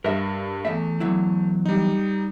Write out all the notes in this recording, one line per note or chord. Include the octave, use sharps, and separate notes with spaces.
G2 A#4 E5
E2 A3 E5
E2 F#3 E4
G3 D#4